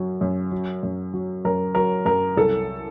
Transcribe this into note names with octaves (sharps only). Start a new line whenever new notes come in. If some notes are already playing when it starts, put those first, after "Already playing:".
Already playing: F#2 F#3
F#2
F#3
F#2
F#3
F#2 A#4
F#3 A#4
F#2 A#4
C2 A4